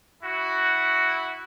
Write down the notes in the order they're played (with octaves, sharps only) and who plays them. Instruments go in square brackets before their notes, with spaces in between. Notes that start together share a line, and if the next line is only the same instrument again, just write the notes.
[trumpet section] E4 F#4